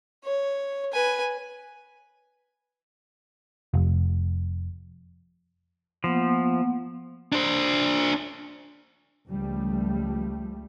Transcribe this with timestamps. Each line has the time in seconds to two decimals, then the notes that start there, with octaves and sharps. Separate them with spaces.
0.24 C#5
0.92 B4 G#5
3.74 F1
6.04 F3 A#3 B3 F#5
7.33 D4 C5
9.27 C#2 F3 G3 A3